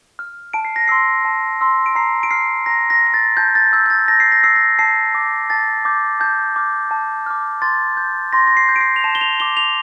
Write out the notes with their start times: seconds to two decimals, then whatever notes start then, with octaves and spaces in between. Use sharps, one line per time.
0.19 F6
0.53 A5 D7
0.65 C7
0.76 A#6
0.88 C6 E6 C7
1.25 A5
1.61 C6 E6
1.86 D7
1.95 A#5 C7
2.23 D7
2.31 F6 C7
2.66 A#5 A#6
2.90 A#6
3.02 F6
3.07 A#6
3.14 A6
3.37 A5 G6
3.55 A6
3.73 E6 G6
3.86 G6
3.90 A6
4.08 A5 A#6
4.20 C7
4.32 A#6
4.44 E6 G6 C7
4.56 A#6
4.79 A5 C7
5.15 D6 G6
5.50 A5 A6
5.85 D6 G6
6.20 A5 G6
6.56 D6 F6
6.91 A5
7.26 D6 F6
7.62 C6 A6
7.97 G6
8.33 C6 A#6
8.47 A#6
8.57 C7
8.69 G6
8.76 D7
8.81 C7
8.96 F7
9.04 A5 E7
9.15 G7
9.21 F7
9.40 D6 G6 G7
9.57 F7